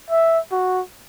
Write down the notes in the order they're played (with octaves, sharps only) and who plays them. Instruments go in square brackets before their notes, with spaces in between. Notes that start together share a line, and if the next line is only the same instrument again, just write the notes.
[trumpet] E5
F#4